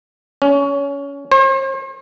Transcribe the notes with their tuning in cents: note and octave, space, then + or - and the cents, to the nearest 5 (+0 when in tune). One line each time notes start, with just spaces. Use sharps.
C#4 +20
C5 +45